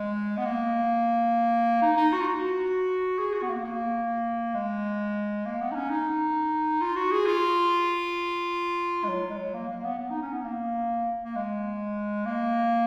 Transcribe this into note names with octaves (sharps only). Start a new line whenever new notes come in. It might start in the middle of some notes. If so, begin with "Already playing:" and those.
Already playing: G#3
B3
A#3
D#4
D#4
F#4
F4
F#4
G#4
F#4
B3
A#3
A#3
G#3
A#3
B3
D#4
C#4
D#4
F4
F#4
G#4
F4
G#3
F#3
G#3
F#3
A#3
A#3
B3
B3
D#4
C#4
B3
A#3
A#3
G#3
A#3